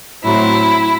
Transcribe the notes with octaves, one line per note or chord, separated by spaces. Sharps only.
A2 F#3 C4 E4